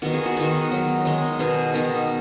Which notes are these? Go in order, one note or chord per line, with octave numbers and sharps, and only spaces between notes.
D#3 B3 D#4 F#4
G#4
F#4
D#3 B3 D#4 F#4
F#3 D#4
D#3 G#3 D#4
B2 B3 D#4 G#4
D#3 B3 D#4